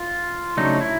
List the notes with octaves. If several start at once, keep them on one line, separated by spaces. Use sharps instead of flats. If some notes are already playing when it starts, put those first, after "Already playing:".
Already playing: F4
C#3 F#3 A3 D4 D#4
E4